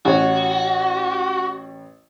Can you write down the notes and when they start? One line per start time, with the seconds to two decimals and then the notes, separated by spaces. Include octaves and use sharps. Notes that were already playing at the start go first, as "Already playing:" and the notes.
0.05 A1 F#4 C#5